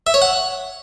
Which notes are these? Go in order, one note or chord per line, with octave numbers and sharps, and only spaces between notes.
E5
C#5
F#5